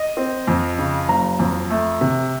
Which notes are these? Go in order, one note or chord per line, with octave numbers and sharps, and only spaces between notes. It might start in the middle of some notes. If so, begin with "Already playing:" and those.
Already playing: D#5
C4
F2
C#3
F#1 A#5
F2
A3
C3